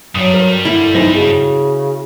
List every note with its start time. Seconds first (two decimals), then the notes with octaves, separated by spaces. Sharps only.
0.15 G2 F#3 G3 D#6
0.34 A#4
0.65 D3 E4
0.95 B1 D#4 C5 A#6
1.15 C#3 F#4 G#4